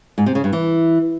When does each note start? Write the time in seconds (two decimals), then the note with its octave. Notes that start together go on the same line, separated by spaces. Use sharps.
0.18 G#2
0.26 C3
0.35 C#3
0.44 G2
0.53 E3